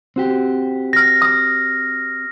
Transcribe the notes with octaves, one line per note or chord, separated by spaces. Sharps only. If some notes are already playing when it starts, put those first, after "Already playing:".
C4 F#4 G4
F6 A#6
D#6